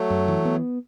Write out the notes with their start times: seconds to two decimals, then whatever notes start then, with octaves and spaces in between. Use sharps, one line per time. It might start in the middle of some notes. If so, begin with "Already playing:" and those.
Already playing: F#3 A3
0.10 F#2
0.28 E3
0.45 B3